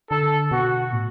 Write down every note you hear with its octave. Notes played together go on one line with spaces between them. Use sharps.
D3 A4
B2 F#4
A2